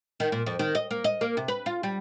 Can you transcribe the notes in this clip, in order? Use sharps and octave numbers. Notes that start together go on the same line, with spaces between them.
D#3
A#2
F2
D#3
D#5
A#3
D#5
A#3
C3
B4
F4
G3